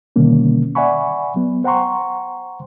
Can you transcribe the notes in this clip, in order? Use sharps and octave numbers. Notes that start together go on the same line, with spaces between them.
B2 D3 D#3 G3 A#3 C#4
D5 E5 F#5 G#5 B5 C#6
F#3 B3
C5 F#5 G5 A#5 C6 C#6